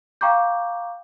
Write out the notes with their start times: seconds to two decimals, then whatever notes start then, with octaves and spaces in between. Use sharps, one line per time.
0.21 F5 G5 A#5 C#6 D6 G6